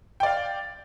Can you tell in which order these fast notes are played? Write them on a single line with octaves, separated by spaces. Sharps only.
G5 D5 F5